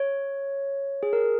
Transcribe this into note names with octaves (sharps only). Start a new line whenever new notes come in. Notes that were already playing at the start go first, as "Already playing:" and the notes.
Already playing: C#5
G#4
A#4